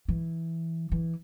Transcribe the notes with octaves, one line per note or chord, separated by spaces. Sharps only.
E3
E3